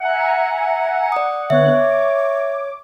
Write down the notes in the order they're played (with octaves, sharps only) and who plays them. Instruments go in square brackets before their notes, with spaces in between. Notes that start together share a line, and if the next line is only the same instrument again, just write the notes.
[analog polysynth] E5 G#5 A#5 [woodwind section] F#5
[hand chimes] D5 D#6
[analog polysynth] D3 B3 F#6 [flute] C#5 [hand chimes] E5
[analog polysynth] D6